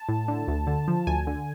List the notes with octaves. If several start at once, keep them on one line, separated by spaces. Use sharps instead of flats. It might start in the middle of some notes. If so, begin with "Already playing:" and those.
Already playing: A5
A2
D3
D2
D3
F3
D2 G#5
D3